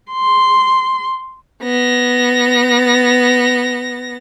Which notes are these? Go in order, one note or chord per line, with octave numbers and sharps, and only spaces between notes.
C6
B3 A#6